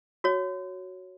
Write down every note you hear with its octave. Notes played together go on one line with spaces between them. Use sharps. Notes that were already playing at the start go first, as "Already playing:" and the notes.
F#4 C#5